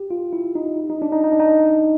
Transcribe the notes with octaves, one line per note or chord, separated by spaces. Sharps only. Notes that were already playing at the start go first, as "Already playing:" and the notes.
Already playing: G4
F4
E4
D#4
D#4
D4
D#4
D#4
D4
D#4